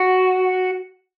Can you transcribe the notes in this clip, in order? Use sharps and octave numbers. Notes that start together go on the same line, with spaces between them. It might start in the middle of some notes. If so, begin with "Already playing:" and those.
Already playing: F#4